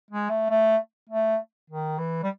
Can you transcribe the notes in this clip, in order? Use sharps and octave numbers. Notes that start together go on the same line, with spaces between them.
G#3
A3
A3
A3
D#3
E3
G3